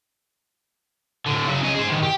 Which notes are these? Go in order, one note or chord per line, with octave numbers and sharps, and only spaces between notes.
A2 D3
C#3 F#3
C#4 D#5
G#4 C5
A2 D#3
G4 G5